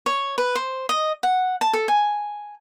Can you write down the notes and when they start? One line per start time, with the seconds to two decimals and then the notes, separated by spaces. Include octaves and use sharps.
0.06 C#5
0.38 B4
0.55 C5
0.89 D#5
1.23 F#5
1.61 A5
1.73 A4
1.88 G#5